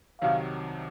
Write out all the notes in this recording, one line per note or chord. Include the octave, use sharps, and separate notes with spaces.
C2 C3 D#3 F#3 F5